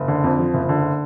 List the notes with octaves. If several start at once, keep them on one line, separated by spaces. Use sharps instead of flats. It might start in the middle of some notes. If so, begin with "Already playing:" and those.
Already playing: F#1
D3
F2
F3
F#1
D3